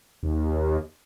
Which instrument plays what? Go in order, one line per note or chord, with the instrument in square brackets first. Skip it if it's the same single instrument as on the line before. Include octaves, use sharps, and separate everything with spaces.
[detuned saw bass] D#2